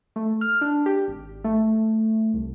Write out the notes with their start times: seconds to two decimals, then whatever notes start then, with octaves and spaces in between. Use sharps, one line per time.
0.16 A3
0.41 F6
0.61 D4
0.86 G4
1.08 G#1
1.44 A3
2.34 C2